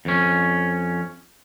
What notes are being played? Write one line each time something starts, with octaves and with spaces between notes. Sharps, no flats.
F2 C#4